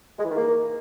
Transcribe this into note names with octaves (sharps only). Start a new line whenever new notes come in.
G#3
E3
D#3
A#3